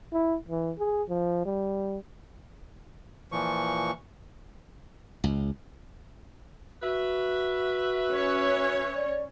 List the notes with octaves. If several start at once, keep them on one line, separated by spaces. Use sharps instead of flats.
E4
E3
G#4
F3
G3
A#2 E3 F3 C#6
C#2
F#4 B4 E5
C#4 C#5
D5